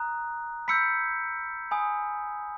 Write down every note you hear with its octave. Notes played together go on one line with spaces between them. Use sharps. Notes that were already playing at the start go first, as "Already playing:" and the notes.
Already playing: A#5 D#6 F#6
B5 E6 G6 B6 C#7
G#5 B5 D#6